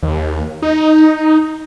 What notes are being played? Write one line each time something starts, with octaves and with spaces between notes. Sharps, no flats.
D#2
D#4